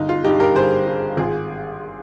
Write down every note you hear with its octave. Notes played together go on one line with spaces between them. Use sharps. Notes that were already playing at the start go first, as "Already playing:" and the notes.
Already playing: G1 D#4
F4
G2 G3 D#4 G4
G4 A#4
G1 G#4 C5
G2 G3
G#1 F4 G#4